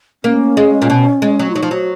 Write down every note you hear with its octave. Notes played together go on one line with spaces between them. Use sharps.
A#3 C#4
G#3
A#2
B2
G#3
F#3
F4
F#3 D#4
F3
F#3 F#4